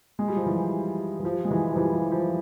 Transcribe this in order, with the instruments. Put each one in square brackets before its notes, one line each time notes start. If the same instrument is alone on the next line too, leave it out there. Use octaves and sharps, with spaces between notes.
[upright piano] G#3
G3
F3
E3 G3
E3
F3
G#3
E3 G3
F3
E3 G3
F3
F3